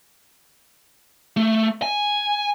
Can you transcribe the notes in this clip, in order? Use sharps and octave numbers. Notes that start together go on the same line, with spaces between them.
A3
G#5